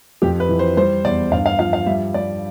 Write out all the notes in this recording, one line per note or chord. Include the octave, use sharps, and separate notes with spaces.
F2 G4
B4
E3
C5
G3 C5
E2 D5
G2 F5
F5
F3 F5
F5
G3 E5
G3 D5